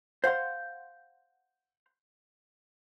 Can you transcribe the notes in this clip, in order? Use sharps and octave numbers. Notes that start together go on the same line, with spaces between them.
C5 F5 F#5 C6